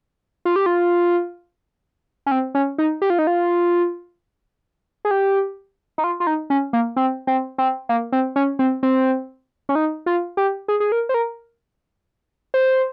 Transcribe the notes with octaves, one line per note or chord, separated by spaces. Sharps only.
F4
G4
F4
C#4
C4
C#4
D#4
G4
F4
D#4
F4
G#4
G4
D#4
F4
F4
D#4
C#4
A#3
C4
C4
C4
A#3
C4
C#4
C4
C4
C#4
D#4
F4
G4
G#4
G#4
A#4
C5
A#4
C5